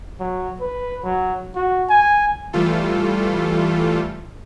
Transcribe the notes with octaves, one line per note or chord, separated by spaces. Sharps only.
F#3
B4
F#3
F#4
G#5
E3 G3 A3 F4 A4